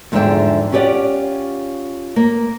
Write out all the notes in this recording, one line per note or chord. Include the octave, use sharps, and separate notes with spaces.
E2 G#2 D3 F3 E5 G5
C#4 F4 G4 C#5 D5 F#5
A#3